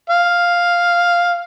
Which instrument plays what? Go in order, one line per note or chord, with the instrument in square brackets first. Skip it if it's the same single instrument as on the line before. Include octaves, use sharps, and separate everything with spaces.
[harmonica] F5